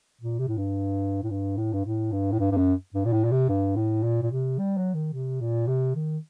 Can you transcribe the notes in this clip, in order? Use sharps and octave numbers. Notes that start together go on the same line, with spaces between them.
A#2
C3
A2
G2
A2
G2
A2
G2
A2
G2
A2
G2
G2
F#2
G2
A#2
A2
A#2
C3
G2
A2
A#2
A#2
C3
G3
F#3
D#3
C3
A#2
C3
D#3